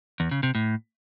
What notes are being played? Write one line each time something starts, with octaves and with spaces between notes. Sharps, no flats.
E2
C#3
C3
A2